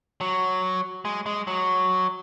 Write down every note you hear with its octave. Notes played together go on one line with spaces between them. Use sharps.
F#3
G#3
G#3
F#3